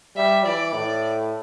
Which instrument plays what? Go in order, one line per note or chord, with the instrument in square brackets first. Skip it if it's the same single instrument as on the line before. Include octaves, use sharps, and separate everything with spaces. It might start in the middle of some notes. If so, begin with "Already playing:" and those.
[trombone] G3 [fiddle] E5
[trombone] E3 [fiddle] D5
[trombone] A2